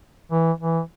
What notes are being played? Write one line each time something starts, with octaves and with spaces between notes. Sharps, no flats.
E3
E3